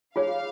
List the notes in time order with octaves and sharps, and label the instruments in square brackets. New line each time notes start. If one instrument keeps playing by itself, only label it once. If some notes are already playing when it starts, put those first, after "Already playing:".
[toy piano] F4 G#4 C#5 [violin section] F5